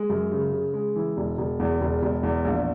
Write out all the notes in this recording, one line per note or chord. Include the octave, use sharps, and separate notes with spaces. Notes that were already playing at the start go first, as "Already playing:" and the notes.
Already playing: G#3
F#2
C#3
C#3
G#3
E3
E1
E1
E2
E1
E1
E2
A#1